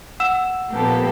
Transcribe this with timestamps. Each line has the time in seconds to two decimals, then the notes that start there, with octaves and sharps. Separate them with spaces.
0.20 F#5 E6 E7
0.74 A#1 A#3 B3 G4 A4